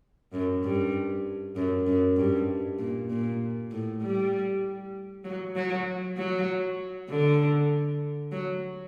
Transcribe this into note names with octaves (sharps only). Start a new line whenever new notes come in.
F#2
G2
F#2
F#2
G2
A#2
A#2
A2
G3
F#3
F#3
F#3
D3
F#3